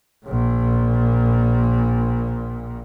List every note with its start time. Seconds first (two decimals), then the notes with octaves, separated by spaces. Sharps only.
0.25 A#1 A#2